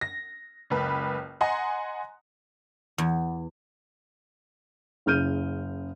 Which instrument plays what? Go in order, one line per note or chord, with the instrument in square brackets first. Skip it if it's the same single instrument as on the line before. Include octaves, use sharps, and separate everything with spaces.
[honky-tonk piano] A#6
F#1 C#2 B4 B5
D#5 F#5 G#5 A#5 C6
[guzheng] E2
[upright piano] F#1 C#3 F6 G6 D#7